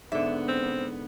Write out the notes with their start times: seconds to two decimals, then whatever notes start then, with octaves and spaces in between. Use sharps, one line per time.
0.12 G#2 D3 B3 E5
0.48 C4